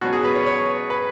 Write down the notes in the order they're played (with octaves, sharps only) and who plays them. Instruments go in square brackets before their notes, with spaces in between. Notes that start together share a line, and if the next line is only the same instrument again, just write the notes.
[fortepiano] B2 F#3 C#4 F#4
G#4
B4
C#5
C#5
B4